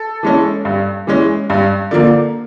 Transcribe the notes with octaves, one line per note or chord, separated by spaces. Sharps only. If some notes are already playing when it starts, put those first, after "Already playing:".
Already playing: A4
E3 G#3 C#4
G2
E3 G#3 C#4
G2
D3 F3 A#3